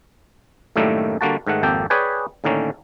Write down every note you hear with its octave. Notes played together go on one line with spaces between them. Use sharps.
F#2 A2 D#3 G3 A3 A#3
D3 G3 A#3 F#4 A5
G#2 D#3 A3 F#5
G#1 F2 A#3 G4 A4 G5
G#4 B4 C#5 D5 G5 G#5
A2 D3 D#3 A#3 C#4